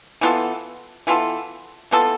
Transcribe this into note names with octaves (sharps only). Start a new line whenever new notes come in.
E3 B3 F4 A4
E3 B3 F4 A4
E3 B3 F4 A4